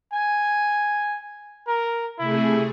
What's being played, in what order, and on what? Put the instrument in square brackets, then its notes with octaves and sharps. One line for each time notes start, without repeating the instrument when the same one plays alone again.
[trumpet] G#5
A#4
[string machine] C3 A3 G#4 [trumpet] E4